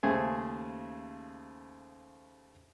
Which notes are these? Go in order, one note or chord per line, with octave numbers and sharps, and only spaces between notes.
D#2 C#3 A3 G#4 C5 G#5